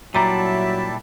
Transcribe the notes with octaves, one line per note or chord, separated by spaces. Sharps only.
A#2 F#3 G3 D4 E4 E5 A5 A#5